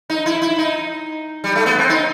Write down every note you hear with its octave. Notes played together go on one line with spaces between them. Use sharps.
D#4
E4
E4
D#4
G3
A3
B3
C4
D#4